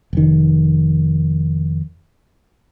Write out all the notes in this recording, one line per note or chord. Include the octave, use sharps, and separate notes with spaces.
F1 D#3